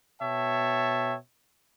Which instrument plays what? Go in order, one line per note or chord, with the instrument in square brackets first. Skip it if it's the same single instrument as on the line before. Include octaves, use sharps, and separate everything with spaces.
[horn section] B2 C#5 E5 G5 A5